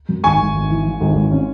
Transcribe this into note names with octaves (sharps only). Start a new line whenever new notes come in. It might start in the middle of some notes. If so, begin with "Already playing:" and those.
F#2
G#1 G#5 C#6
G#1
G#1
E3
E3
G#1
G#1
C#4